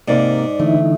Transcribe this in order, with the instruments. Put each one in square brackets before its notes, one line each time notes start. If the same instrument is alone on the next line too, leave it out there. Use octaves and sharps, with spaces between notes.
[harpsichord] G#2 [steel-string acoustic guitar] C3 A#3 A#4 [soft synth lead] D5
[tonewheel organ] D3 E3 D#4 [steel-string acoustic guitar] A3